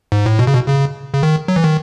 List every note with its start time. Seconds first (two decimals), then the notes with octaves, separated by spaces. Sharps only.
0.12 G#2
0.26 A2
0.39 B2
0.47 C#3
0.54 B2
0.68 C#3
1.14 C#3
1.23 D#3
1.48 F#3
1.56 E3
1.64 D#3